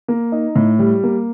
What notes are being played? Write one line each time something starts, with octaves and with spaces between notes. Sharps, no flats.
A#3
D#4
A2
G3
A#3